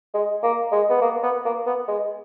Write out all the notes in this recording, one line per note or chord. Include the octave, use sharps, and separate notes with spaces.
G#3
A#3
G#3
B3
A#3
B3
A#3
B3
G#3